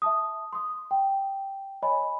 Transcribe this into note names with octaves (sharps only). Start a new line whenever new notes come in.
E5 A5 D#6
C6 D#6
G5
C#5 D#5 G#5 B5